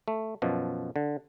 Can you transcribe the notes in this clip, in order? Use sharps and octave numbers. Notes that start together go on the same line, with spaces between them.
A3
F#2 B2 F3
D3